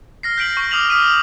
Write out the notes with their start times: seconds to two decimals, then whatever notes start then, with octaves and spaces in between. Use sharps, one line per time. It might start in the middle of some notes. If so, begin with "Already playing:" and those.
0.23 F6 A#6 C7
0.38 G6 B6 D7 F#7
0.56 C#6 G6
0.71 D6 D#6 F6 A#6 F7 F#7
0.90 D6 D#6 F6 B6 D#7
1.03 D#6